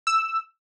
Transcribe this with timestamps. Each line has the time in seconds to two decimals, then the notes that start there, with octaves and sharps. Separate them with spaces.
0.07 E6